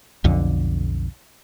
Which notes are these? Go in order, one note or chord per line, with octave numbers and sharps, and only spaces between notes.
B1 F2 D3